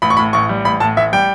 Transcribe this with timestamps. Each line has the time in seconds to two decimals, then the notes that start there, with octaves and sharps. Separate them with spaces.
0.02 A1 B5
0.10 C#6
0.17 A2 B5
0.33 A1 C#6
0.49 G3
0.65 A1 B5
0.80 A2 A5
0.97 A1 E5
1.13 G3 G5